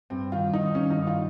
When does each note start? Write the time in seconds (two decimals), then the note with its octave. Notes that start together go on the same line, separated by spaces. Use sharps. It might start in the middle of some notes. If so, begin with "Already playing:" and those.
0.10 G2 C4
0.32 D#3 F4
0.53 G2 D#4
0.75 D#3 C#4
0.90 D#4
0.96 G2
1.07 F4